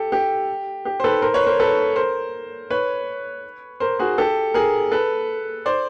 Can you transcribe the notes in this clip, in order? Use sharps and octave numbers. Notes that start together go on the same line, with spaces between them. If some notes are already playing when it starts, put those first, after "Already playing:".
Already playing: G4 A4
G4
G4
C5
A4 B4
A#4 C5
B4 C#5
A#4 C5
A4 B4
A#4 C5
B4 C#5
A#4 C5
F#4 G#4
G4 A4
G#4 A#4
A4 B4
C5 D5